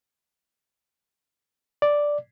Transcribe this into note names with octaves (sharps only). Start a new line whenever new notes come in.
D5